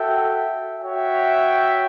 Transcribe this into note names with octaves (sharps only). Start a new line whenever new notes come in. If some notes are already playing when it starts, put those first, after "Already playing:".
Already playing: F#4 A4 E5 G5
F#4 C#5 E5 G5